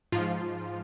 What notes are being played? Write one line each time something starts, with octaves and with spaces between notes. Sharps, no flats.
G#2 F3 F4